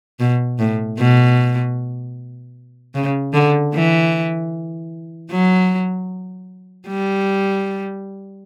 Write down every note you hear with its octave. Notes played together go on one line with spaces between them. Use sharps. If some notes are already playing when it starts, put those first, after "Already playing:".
B2
A2
B2
C#3
D3
E3
F#3
G3